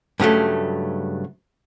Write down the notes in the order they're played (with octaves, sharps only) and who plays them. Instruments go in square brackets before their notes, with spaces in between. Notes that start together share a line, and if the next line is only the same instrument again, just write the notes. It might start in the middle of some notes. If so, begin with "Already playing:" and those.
[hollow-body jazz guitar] G2 C#3 F#3 A3